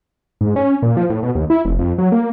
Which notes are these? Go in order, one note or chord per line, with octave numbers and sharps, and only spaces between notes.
G#2
C#4
A#2
F3
A2
B2
D#2
E4
F1
F2
F#3
A#3